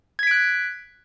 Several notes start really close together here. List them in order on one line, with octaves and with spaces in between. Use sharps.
G#6 B6 D7 F#6